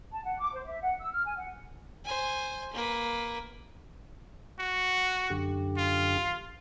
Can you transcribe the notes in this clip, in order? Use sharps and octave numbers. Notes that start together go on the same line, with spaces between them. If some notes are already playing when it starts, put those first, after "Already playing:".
A5
F#5
D6
C5
E5
F#5
E6
F6
G#5
F#5
C5 G#5
A#3 B4
F#4 F#5
F#2 D3 G4
F4